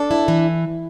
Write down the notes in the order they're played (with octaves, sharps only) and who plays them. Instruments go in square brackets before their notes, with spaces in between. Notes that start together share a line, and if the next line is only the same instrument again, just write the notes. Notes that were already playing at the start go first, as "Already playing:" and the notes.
Already playing: [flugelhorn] D4 [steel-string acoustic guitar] A4
[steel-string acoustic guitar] E4
E3